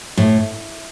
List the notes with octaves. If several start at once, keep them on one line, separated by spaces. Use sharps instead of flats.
A2